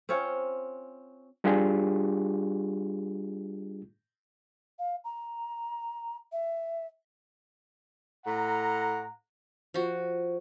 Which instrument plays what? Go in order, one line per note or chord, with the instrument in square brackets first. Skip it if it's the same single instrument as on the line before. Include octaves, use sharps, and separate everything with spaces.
[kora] C4 C#4 F4 C#5
[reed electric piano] G3 D4 F4 G4 G#4
[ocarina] F5
A#5
E5
[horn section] A2 F#5 A#5
[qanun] F3 F#4